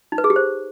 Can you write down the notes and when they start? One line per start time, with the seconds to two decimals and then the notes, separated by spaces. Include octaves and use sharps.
0.12 D#4
0.18 B4
0.24 G#4
0.30 G4
0.36 C5